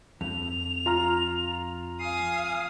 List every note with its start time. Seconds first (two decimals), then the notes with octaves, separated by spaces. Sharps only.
0.21 F2 F7
0.86 F4 A#5 F6
1.99 F5 G#5 D#6 C7